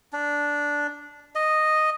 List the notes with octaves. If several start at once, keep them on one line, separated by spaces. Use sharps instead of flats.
D4
D#5